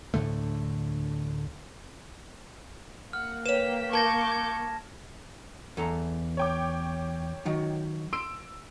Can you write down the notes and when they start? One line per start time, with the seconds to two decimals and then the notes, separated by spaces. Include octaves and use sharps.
0.14 D2 A2 D3 A3
3.13 A#3 F#5 F6
3.46 B4 C#5 G5 B6 E7
3.93 A#4 A5 C#6 D6 G6 G#6 A#6
4.32 G#6
5.77 E2 A4 A#5
6.37 C#5 G5 D6
7.45 D#3 F#3 D#4
8.13 C6 E6 D7